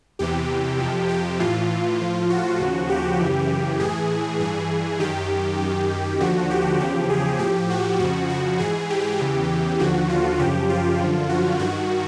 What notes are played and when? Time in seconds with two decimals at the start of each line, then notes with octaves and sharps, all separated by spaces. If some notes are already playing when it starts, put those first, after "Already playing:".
0.19 E2 C3 E3 G4
0.79 F2 C3 F3
1.09 G4
1.40 A2 E3 F4
2.00 A2 F3
2.30 F#4
2.60 D#2 C#3 F3
2.89 G4
3.20 F#2 C#3 E3
3.79 A2 E3 G#4
4.40 G2 E3 G#4
4.99 F#2 D#3 G4
5.60 F#2 D#3
6.20 D#2 D3 F3 F#4
6.50 G4
6.80 E2 C#3 F3 G4
7.10 G#4
7.39 A2 F3 G4
7.70 F#4
8.00 F2 C#3 F3 F#4
8.30 F#4
8.59 G#2 E3 G#4
8.90 G4
9.20 E2 C#3 E3
9.80 D#2 D3 F3 F#4
10.10 F4
10.39 F#2 C#3 F3 G4
10.69 F4
10.99 F#2 D3 F3
11.29 F#4
11.59 G2 D#3 F#4